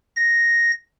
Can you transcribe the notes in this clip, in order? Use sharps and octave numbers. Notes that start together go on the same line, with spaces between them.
A#6